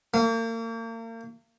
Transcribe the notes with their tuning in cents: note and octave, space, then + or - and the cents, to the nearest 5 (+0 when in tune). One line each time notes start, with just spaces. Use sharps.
A#3 -40